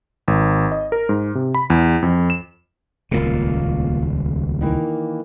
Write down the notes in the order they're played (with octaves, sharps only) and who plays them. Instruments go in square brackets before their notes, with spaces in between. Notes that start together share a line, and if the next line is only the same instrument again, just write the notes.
[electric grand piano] G#1
D#5
A#4
G#2
C3
B5
E2
F2
E7
[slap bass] D#1 C#2 B2 [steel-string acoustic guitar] A#3 F4
[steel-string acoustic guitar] D#3 E3 A#3